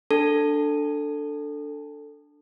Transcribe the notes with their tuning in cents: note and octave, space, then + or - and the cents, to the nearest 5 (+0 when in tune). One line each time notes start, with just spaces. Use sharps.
D4 +0 A4 +10